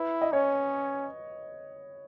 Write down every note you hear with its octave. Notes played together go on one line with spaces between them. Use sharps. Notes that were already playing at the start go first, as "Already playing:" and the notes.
Already playing: E4 B4
D#5
C#4 C#5